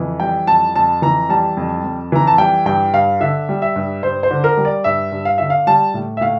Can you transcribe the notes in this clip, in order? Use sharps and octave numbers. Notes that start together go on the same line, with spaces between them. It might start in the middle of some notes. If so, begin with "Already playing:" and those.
Already playing: F2 E3
G3 G5
F2 A5
F2 A5
E3 A#5
G3 A5
F2
F2
E3 A#5
A5
G3 G5
G2 G5
G2 F5
D3 E5
G3
E5
G2
G2 C5
C5
D3
A#4
G3
D5
G2 E5
G2
F5
D3 E5
F5
G3 A5
A2
E5
A2 F5